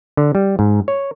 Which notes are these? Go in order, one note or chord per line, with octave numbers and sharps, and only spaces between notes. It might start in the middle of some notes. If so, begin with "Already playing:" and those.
D3
G3
G#2
C#5